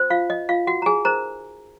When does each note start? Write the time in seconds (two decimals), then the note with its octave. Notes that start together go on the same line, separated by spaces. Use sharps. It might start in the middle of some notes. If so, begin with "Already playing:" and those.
Already playing: C#4 F#4 C5
0.10 F4 F5
0.30 D#5
0.49 F4 F5
0.67 F#4 F#5
0.82 A#5
0.86 G#4 G#5
1.05 D#4 G#4 A#4 C5 A#5